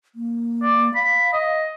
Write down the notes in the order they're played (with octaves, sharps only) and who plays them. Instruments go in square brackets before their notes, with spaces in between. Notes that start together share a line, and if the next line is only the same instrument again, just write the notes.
[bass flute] A#3
[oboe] D5
[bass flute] F5 [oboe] B5
[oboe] D#5